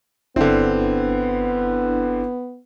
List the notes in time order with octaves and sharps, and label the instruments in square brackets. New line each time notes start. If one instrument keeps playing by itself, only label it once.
[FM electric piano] G1 D4 E4 [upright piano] D3 C4 [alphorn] B3